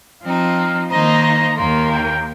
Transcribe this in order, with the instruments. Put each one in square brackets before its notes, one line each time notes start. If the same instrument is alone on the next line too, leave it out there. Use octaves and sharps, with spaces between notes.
[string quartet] F3 C4 D#4 [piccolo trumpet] F5
[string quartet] D#3 A#3 D#4 C5 D#5 [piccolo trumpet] A#5
[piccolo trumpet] A#5
[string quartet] D#2 D#3 A#3 [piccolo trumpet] C6
[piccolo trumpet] G5